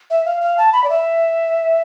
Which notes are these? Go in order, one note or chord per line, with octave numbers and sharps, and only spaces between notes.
E5
F5
F5
A5
B5
D5
E5